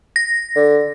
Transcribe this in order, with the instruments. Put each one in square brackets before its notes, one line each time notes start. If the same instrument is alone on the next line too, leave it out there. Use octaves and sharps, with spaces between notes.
[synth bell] A#6
[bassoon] D3